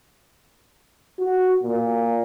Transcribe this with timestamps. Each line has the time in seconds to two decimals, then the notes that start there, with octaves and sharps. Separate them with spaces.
1.19 F#4
1.63 A#2